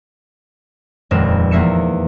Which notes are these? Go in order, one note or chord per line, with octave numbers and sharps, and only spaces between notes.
D#1 F2 G#3 B3 A#4 E7
E2 E3 A#3 E5 C#7 E7